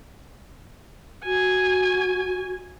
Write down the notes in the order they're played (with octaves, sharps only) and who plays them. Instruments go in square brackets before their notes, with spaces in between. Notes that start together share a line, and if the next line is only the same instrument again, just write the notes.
[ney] F#4 [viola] G#5